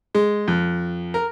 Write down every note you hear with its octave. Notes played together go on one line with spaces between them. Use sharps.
G#3
F2
A#4